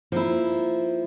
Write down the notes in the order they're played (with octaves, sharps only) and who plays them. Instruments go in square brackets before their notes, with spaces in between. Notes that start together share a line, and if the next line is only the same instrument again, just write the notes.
[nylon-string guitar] F3 A#3 E4